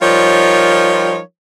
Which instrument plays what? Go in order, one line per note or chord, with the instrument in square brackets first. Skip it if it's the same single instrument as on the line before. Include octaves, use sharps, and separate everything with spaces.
[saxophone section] F3 G3 D#4 F4 A#4 C#5